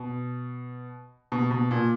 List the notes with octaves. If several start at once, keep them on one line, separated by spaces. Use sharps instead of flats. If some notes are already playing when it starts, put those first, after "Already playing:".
Already playing: B2
B2
B2
A#2